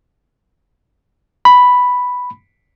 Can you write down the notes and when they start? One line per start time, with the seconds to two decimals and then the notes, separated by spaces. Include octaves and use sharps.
1.45 B5